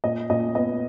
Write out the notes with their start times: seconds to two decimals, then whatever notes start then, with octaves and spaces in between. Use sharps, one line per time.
0.04 A#2 D#5
0.30 A#2 D#5
0.55 B3 D#5